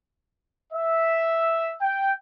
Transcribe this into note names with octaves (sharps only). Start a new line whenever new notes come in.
E5
G5